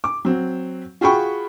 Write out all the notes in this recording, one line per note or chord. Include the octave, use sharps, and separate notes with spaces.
D6
F#3 C4
F4 F#4 G#4 G5 B5 C#6